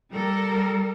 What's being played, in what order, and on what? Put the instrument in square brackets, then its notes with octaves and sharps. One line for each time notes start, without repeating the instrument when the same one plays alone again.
[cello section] G3 A4 A#4